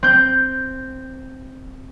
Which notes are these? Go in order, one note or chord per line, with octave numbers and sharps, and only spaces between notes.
C4 G6